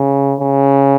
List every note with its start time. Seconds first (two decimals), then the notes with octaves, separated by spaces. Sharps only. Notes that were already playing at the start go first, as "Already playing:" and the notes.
Already playing: C#3
0.40 C#3